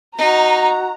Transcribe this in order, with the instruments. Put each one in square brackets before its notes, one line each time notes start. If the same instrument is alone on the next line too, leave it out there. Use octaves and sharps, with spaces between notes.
[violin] D#4 [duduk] F#4 [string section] A#5